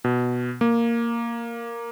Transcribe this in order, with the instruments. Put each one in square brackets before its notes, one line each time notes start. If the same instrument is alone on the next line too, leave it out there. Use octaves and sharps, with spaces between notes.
[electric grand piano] B2
A#3